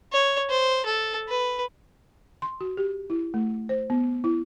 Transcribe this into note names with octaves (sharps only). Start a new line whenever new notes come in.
C#5
C5
A4
B4
C6
F#4
G4
E4
A3
C5
B3
E4